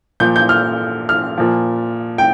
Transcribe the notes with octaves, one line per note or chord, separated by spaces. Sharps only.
A#2 F3 G6
G6
F6
F6
A#2 F3
G5